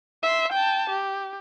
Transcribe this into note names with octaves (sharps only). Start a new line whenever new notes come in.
E5 C6
G5 A5
G4